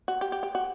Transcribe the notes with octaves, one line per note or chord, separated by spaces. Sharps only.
F#4
G4
G4
G4
F#4